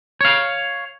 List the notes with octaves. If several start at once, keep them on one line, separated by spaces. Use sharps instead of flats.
C#5 F5